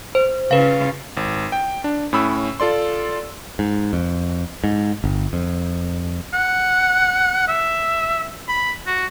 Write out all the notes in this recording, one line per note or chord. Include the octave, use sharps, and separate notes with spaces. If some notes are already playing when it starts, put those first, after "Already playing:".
C5
C#3 F4 B4 F5
G#1
G5
D4
A2 C#4 B5 E6
F4 A4 D5 C6
G#2
F2
G#2
G1
F2
F#5
E5
B5
F#4